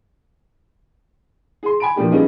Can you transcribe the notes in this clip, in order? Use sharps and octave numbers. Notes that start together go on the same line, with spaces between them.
G#4 C6
G#5 B5 D7
A#2 E3 F3 A3 D4 G4
G3 B3 C#4 D#4 F4 G#4